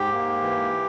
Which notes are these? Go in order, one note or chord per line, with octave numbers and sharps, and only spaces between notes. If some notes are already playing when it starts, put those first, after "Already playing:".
Already playing: G#2 G4
A#3
E3